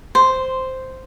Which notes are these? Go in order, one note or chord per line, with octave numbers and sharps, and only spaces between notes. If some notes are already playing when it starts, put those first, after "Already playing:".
C5